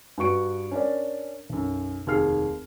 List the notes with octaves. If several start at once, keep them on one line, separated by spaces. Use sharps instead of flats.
G2 F#4 C#6 D7
C#4 D4 A#4 D5
B1 F#2
F1 D#2 G#4 F6 C7